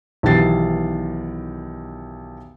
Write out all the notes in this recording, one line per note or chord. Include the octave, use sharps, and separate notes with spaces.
B1 D#3 E3 G4 A6 C7